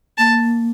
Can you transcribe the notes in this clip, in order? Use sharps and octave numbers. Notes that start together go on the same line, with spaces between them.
A#3 A5